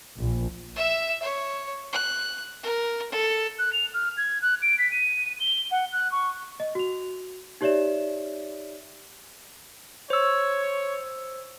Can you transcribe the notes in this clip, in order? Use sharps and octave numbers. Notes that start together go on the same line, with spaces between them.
A#1
E5 E6
C#5
F#6
A#4
A4
F#6
F7
F6
G#6
F#6
D7
B6
D#7
G7
F#5
F#6
C#6
D#5
F#4 F7
D#4 G4 C#5 D5 E5 E7
C5 C#5 E6